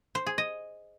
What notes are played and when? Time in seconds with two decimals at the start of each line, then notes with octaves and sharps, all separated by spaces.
0.15 C5
0.27 G#4
0.38 D#5